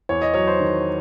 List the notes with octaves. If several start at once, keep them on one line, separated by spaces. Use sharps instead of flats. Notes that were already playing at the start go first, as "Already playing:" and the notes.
E2 C#5
D#5
F#3 C#5
C5
D#3